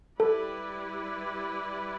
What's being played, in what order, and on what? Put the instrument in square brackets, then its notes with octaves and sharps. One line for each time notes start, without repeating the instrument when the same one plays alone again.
[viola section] G3 E4 B4 D5 [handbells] A4